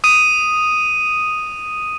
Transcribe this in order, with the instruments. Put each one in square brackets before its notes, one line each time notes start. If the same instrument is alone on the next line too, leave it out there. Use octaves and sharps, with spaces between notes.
[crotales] D#6 D#7